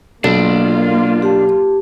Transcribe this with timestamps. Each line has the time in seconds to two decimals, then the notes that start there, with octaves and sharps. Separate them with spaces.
0.24 B1 A#3 D4 F4
1.22 G4 A5